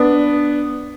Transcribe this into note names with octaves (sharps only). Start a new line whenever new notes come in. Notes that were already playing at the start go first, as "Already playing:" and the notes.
Already playing: B3 D4